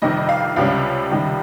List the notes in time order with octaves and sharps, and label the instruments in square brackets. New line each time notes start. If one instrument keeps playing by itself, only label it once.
[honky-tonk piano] G1 F2 C3 D#3 D#5
F5
C#2 C3 G3 C#4 F5
C#2 C3 D#3 G3